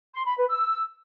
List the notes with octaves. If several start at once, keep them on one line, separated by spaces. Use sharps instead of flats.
C6
B5
B4
E6